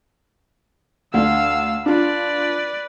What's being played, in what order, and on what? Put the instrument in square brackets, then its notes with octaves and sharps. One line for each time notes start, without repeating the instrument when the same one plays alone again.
[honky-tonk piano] D2 D4 [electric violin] F5 E6
[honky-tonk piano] D4 F4 [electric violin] B4 D5